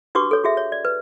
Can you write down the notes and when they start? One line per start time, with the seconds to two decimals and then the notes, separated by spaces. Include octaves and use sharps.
0.15 D4 F#4 G4 B4 C#6 D6
0.31 A4 C#5
0.44 F#4 G#4 E5
0.57 C#5
0.72 D5
0.85 B4